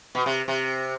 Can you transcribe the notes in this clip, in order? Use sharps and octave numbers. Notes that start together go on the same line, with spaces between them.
B2
C3
C3